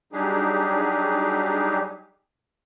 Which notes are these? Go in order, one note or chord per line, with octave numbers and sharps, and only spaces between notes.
F#3 G3 D4 D#4 G4 G#4